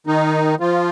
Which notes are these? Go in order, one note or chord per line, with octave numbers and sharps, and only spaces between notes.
D#3 D#4
F3 F4